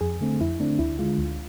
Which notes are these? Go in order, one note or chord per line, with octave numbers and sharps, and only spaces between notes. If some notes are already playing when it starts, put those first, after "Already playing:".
F2 G#4
D3 A3 C4
F2 E4
D3 A3 C4 D4
D2 E4
D3 G#3 F4
D2